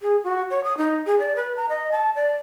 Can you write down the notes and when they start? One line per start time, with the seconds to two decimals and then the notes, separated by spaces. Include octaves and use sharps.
0.01 G#4
0.24 F#4
0.50 C#5
0.64 D#6
0.77 D#4
1.06 G#4
1.19 D5
1.36 B4
1.56 A#5
1.69 D#5
1.92 A5
2.15 D5